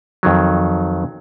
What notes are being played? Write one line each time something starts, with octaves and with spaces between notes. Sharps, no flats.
F2 D#3 F#3